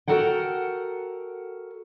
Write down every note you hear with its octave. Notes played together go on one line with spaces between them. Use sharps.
F#4 G4 A4 A#4 F#5 G5